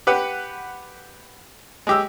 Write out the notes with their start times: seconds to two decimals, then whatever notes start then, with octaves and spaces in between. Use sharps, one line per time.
0.07 G4 B4 F#5
1.87 G#3 G4 E6